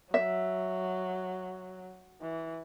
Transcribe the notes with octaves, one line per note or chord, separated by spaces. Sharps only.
F#3 E5
E3